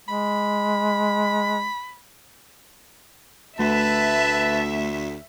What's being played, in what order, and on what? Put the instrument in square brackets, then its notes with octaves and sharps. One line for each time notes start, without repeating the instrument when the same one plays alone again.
[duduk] G#3 [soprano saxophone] B5
[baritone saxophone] D2 [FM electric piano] A3 [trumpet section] B4 A5 [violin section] E5